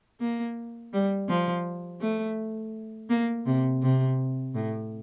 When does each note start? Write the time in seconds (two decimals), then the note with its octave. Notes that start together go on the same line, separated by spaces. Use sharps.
0.20 A#3
0.93 G3
1.29 F3
2.01 A3
3.09 A#3
3.46 C3
3.82 C3
4.55 A2